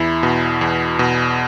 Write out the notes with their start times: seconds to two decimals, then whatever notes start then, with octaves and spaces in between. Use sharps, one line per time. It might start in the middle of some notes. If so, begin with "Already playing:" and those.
Already playing: E2 E4
0.23 B2
0.61 E2
0.99 B2